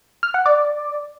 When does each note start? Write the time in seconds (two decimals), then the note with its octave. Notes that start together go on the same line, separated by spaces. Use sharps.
0.23 F6
0.34 F#5
0.46 D5